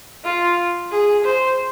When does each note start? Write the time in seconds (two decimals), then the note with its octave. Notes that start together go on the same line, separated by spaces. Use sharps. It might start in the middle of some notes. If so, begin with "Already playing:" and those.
0.25 F4
0.92 G#4
1.25 C5